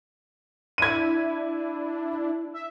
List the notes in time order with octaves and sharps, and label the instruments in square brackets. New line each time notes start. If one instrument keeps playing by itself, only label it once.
[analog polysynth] D4 E4 [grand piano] G#6 D#7
[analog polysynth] E5